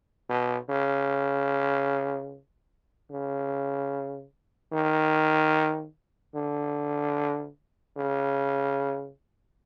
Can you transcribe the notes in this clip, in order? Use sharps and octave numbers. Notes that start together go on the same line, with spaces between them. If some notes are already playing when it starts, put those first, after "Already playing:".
B2
C#3
C#3
D#3
D3
C#3